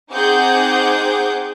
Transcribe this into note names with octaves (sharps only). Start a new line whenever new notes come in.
C4 D#4 G#4 F#5 D6 G6